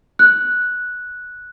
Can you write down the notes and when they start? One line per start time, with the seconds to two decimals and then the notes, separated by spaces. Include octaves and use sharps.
0.19 F#6